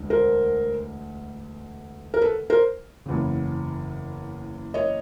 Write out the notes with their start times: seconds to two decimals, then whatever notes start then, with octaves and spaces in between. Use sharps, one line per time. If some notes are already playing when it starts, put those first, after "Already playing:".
Already playing: E1 D2 D3
0.10 A#4 C5
2.14 A#4
2.22 A4 B4
2.50 A#4 C5
3.06 F#1 E2 C#3
4.74 C#5 D#5